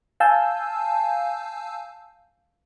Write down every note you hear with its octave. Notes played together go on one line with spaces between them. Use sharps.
F5 G#5 A5 E6 G6